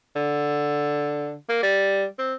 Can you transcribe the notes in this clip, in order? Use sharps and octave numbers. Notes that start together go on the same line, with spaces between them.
D3
A#3
G3
C4